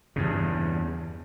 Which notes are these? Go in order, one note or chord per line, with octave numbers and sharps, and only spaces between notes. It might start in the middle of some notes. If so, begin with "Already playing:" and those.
E2 G2 C#3